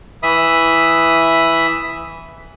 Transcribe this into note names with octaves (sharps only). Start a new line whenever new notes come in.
E3 E5 B5 D#6